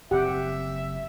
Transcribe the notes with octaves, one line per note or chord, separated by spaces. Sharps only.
F#1 C4 G4 E5 F#5